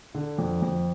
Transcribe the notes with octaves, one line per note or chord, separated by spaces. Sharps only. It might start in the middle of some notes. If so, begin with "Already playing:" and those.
D3
F2
F2